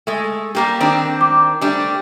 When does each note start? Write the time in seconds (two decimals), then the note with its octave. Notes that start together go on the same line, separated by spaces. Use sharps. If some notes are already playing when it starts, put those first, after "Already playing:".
0.07 G#3 A3
0.55 G3 A#3 G4
0.80 D#3 C4 D4
1.21 D6
1.61 G3 A3 D4